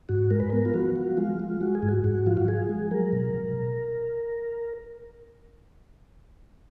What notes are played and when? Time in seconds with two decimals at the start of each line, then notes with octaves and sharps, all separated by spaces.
0.09 G#2 F#4
0.31 G#3 A#4
0.40 B4
0.50 B3 A#4
0.65 F4
0.74 F3 F#4
0.96 F3
1.17 G#3 F4
1.40 G#3
1.61 G#3 F#4
1.75 G#4
1.83 G#2
1.89 F#4
2.04 G#2 F#4
2.26 F3 F4
2.37 F#4
2.48 F3 G#4
2.69 G#3
2.91 F#3 A#4
3.12 B2
3.34 B2